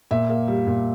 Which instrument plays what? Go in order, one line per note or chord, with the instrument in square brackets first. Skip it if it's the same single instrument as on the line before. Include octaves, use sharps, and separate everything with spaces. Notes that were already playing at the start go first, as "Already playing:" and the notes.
[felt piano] A#2 E5
A#3
G3
A#2